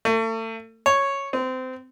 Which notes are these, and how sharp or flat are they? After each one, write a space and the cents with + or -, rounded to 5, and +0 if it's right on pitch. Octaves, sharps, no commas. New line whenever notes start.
A3 +35
C#5 -5
C4 -25